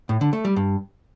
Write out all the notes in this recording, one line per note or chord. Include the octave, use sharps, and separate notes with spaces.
A2
D3
A3
G3
G2